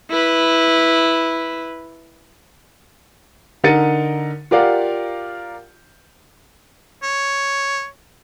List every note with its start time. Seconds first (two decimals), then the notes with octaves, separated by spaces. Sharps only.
0.10 E4 B4
3.64 D3 D#4 A#4 A6 C#7 D#7
4.51 F4 G4 A#4 D5 F5 F#5
7.03 C#5